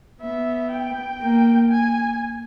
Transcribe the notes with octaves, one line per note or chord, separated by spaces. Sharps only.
B3 E5
G5
A#3
G#5